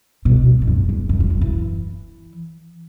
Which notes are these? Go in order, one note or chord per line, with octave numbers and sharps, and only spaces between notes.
B2
A2
A2
F#2
E2
F#2
E2
F#2
E3